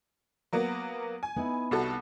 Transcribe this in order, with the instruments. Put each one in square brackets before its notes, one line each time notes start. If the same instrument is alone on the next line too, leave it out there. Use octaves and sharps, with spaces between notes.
[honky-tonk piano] F#3 A#3 B3
G#5
[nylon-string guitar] B3 D#4 E4
[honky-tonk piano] C2 F#4 A4